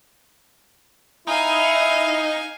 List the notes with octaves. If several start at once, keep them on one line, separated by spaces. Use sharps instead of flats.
D#4 E4 F5 G#5